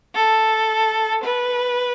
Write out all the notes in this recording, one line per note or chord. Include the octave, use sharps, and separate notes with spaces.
A4
B4